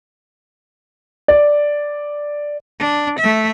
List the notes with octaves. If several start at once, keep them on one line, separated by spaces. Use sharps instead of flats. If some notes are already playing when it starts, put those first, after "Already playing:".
D5
D4
A3 E5